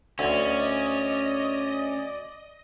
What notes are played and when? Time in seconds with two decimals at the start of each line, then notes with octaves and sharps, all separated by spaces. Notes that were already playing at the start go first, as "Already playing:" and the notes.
0.19 D2 C#4 D5 D#5